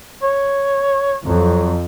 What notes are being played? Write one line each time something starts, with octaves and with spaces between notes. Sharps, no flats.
C#5
F2 F#3